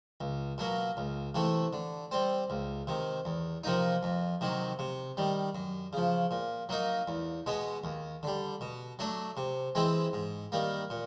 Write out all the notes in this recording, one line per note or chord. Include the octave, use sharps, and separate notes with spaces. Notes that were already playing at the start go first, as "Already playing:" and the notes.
C#2
B2 F#3 A#3
C#2
C3 E3 A3
D3
G3 C4
C#2
C3 D#3
E2
C3 F3 A#3 D#4
F2
C3 D#3 F#3
C3
D#3 G3
F#2
C#3 F3
A#2
F#3 A#3 D#4
E2
B2 G#3 B3
D#2
D3 G3
B2
F#3 A3 D4
C3
E3 G#3 C4 E4
G#2
D#3 G3 A#3
A#2